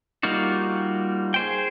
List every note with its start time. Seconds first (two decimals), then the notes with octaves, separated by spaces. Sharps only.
0.23 G3 A#3 D#4 F4 F#4
1.34 G#4 C5 G5